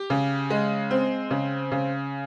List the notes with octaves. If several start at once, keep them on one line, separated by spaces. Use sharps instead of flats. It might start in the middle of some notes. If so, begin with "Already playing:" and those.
Already playing: G4
C#3
G#3
C4
C#3
C#3